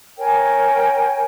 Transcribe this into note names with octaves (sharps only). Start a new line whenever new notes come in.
A#4 C#5 G5 G#5